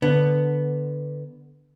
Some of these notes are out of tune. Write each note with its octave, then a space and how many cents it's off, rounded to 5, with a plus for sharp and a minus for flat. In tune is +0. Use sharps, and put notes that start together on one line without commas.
D3 +0 B3 +0